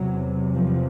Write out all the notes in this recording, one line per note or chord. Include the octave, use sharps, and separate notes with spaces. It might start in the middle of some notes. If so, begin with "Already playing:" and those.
Already playing: E2 C3 F#3
F3